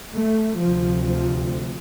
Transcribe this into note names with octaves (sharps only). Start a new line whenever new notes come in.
A3
D2 C3 F3
F3